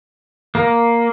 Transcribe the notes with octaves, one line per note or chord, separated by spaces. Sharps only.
A#3